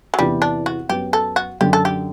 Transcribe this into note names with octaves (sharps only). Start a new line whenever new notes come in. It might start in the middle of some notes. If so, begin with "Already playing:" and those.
F#3
E2 C3 E3 G3 B3 E4
D4
F#4
F#2 F#3 B3 G4
A4
F#4
F#2 D3 F#3 G4
A4
G4